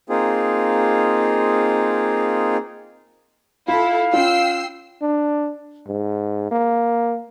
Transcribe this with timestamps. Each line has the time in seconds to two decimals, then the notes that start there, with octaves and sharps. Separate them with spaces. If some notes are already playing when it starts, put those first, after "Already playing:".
0.09 A#3 C4 D#4 F4 G#4
3.68 E4 F4 A4 F5
4.13 C#4 F4 G5 E6 C7
5.02 D4
5.87 G#2
6.51 A#3